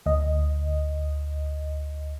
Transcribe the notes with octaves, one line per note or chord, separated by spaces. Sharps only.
D2 D#5